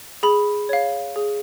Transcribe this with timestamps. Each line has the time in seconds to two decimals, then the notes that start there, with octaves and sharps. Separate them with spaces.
0.23 G#4 B5
0.69 C#5 F5
1.16 G#4